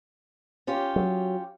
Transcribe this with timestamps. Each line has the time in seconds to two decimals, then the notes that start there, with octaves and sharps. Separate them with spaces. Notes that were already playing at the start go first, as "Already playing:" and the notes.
0.67 C#4 F4 G4
0.96 F#3